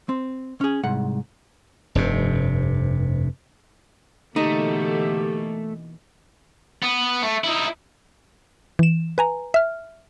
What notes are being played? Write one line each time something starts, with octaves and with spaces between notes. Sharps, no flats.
C4
C#4 G#4
C2 G#2 F#5
F1 G2 C3
B2 D3 E3 A3 A#3 D#4 G4
B3
A3
D#4 E4
E3 E7
B4 G#5 A#5
E5 F6